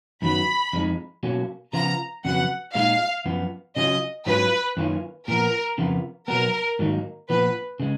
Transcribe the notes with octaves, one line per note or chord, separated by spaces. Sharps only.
F#2 D#3 F#3 B3 B5
F2 F3 G#3 D#4
B2 F#3 A#3 C#4
C#3 F3 B3 F4 A#5
F2 C#3 F#3 B3 F#5
A#2 G#3 D#4 F5
F#2 F3 B3
C#3 F#3 C#4 F4 D#5
G#2 F#3 C#4 F4 B4
F#2 D#3 A#3 C#4 F4
A#2 F3 B3 A#4
F2 C#3 F3 B3 F4
B2 F#3 B3 A#4
G#2 D#3 F#3 A#3 D#4
A#2 F3 B3 B4
C#3 G#3